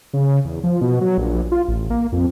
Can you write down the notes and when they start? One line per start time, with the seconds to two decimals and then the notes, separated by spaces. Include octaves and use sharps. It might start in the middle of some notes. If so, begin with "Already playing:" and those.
0.14 C#3
0.45 E2
0.64 F3
0.81 B2
1.01 F#3
1.18 A#1
1.52 F4
1.68 A1
1.90 A#3
2.12 F2